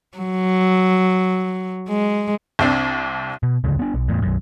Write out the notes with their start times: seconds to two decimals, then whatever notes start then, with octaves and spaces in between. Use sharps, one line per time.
0.18 F#3
1.89 G#3
2.59 C2 C4 D4
3.43 B2
3.64 D1 G1 D2 C#3
3.79 B3 D4
3.94 B1
4.08 E2 A2
4.22 B1 F#2